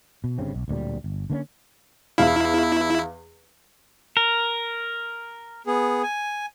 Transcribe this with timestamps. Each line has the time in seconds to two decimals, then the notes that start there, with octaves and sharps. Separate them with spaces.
0.24 B2
0.38 G1 G2 C#3 C4
0.54 B1
0.68 D1 D2 A#2 G3
1.04 G1
1.30 D3 A#3 B3 C#4
2.18 E2 E4 F5
4.17 A#4
5.67 B3 G#4
6.03 G#5